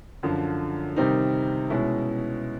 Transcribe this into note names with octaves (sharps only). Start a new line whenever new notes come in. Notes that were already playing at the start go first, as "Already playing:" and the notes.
F#2 D3 F3
C3 D#3 G3 C4 D#4
B2 G#3 C#4 E4